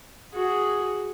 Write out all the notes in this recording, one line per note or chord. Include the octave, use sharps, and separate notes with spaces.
F#4 G#4